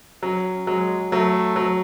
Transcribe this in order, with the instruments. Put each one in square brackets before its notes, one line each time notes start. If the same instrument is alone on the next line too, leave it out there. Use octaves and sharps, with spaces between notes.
[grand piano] F#3 [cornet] C#4
[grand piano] F#3 [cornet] G#3
[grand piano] F#3 [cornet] A3
[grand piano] F#3